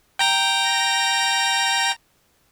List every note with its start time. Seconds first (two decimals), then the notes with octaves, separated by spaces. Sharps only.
0.19 G5 A#5 A#6